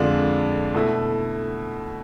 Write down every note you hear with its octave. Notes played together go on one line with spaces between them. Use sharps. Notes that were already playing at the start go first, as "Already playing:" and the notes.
Already playing: F2 D3 G#3 D4 F4
B2 A3 E4